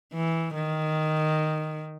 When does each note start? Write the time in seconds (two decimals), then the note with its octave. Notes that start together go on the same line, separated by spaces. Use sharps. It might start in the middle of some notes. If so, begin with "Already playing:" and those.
0.13 E3
0.54 D#3